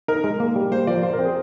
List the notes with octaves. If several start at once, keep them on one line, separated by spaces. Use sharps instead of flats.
D#4 A#4
G#3
A#3
G3
A#3 C5
F3 D5
F4 C5
A#4
C4
G#4